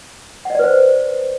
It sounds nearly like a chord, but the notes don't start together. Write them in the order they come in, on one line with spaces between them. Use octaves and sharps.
F#5 D#5 D5 B4 C5